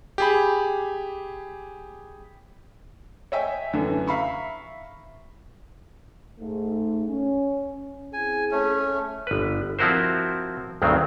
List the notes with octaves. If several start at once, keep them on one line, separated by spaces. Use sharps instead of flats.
G4 G#4 B5
C#5 D#5 E5 G5 G#5
F#2 D3 E3 A3
E5 F5 A#5 B5 C#6
G#2 A3
C#4
C4 E4 G#4 G#5
A3 C#4
G1 B4
F3 C4 E4 F#4 A#4 C5
D2 G2 D#3 F#3 C4